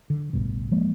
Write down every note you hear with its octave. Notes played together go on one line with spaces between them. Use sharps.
D3
A1 D2 G2 B2
F3 G#3 A#3